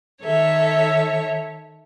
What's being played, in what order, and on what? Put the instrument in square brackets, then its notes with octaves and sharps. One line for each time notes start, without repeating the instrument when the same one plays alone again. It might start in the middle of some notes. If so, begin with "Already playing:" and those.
[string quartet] D#3 A4 C#5 E5